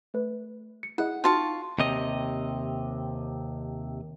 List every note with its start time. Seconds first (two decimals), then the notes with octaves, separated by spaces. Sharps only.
0.14 A3 B4
0.83 C#7
0.98 E4 G#4 D#5 F#5
1.24 D#4 F4 F#4 G5 A5 C#6
1.78 D#2 C3 D#5